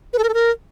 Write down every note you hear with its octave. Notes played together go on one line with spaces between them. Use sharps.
B4
A4
A#4
A4
A#4